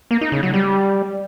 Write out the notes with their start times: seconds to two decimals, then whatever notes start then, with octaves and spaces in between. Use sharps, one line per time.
0.11 A#3
0.21 D#4
0.32 C#3
0.43 F#3
0.54 G3